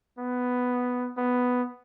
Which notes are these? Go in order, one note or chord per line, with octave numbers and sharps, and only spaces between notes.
B3
B3